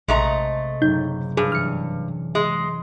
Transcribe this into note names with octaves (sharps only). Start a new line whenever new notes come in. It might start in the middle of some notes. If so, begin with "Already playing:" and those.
A#1 C3 G#3 A3 A4 D#5 A#5
F#1 A2 D#4 G6
G2 G#4
E3 F6 C#7
G#3